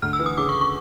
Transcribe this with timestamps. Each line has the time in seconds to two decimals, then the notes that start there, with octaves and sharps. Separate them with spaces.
0.02 D2 F6
0.13 E6
0.19 E3
0.26 D#6
0.38 C#3 D6
0.49 C#6
0.61 C#6